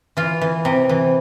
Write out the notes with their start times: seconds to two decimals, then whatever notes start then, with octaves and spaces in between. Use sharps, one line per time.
0.17 E3 F4
0.41 E3
0.65 C3
0.89 E3